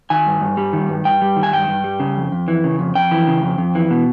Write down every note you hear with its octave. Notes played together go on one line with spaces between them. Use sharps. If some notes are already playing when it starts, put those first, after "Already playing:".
D#3 G#5
G2
G2
G3
D#3
G2
G2 G5
G3
D#3
G#5
G2 G5
G2
G3
C#3
F2
F2
E3
C#3
F2
F2 G5
E3
C#3
F2
F2
E3
B2